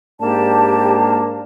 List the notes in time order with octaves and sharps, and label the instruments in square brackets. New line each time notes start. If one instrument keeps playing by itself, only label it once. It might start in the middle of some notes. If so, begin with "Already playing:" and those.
[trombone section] G#2 A#3 D4 [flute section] G4 A5